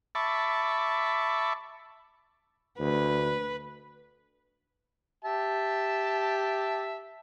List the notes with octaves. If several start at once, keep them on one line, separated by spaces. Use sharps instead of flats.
E5 A5 B5 C#6 D6
D2 B4
G4 E5 A5